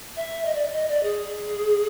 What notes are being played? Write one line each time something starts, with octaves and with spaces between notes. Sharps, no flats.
E5
D#5
D5
D#5
D5
G#4